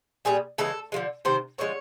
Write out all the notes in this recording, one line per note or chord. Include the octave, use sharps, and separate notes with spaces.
A#2 G3 G#4
C#3 E3 G#3 A4
D3 F3 G#3
C3 D#3 C5
D3 F3 G#3 C#5